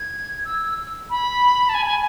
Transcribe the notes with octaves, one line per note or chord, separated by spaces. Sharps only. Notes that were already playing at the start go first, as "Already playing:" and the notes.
Already playing: G#6
E6
B5
A5
G#5
G#5